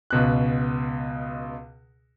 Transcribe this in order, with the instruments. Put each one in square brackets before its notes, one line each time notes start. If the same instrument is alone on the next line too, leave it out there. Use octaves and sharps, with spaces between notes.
[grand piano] C#2 B2 F#6